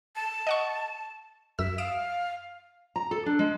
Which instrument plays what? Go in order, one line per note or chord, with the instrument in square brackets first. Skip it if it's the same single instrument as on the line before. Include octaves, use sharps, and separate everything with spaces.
[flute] A5
[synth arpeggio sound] D#5 F#5 C#6
[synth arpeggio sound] F#2 E6 [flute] E5
[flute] F5 [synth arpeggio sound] D#6 D7 E7
[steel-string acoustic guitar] A#5
A4
D4
G#3